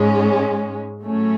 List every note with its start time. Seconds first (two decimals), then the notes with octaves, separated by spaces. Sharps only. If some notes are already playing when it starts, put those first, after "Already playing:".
Already playing: G#2 G#3 C#4
1.04 A2 F#3 A3 C#4